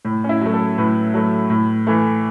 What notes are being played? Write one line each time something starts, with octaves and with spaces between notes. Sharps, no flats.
A2
C#4
E4
F#3 A3
A4
A2 B4
F#3 A3
A2
E3 A3